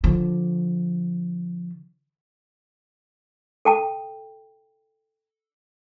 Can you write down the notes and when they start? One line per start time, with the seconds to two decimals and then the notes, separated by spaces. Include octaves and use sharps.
0.04 D3 F3
3.65 A4 G5 A5